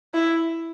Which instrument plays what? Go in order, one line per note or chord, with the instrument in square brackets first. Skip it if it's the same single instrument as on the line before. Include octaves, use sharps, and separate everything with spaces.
[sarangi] E4